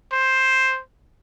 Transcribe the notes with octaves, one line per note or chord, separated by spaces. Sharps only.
C5